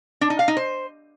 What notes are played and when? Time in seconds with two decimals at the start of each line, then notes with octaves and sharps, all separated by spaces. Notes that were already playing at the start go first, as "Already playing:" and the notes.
0.21 D4
0.30 D#4
0.39 F5
0.48 D#4
0.57 C5